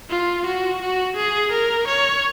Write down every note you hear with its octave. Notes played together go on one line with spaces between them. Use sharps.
F4
F#4
F#4
G#4
A#4
C#5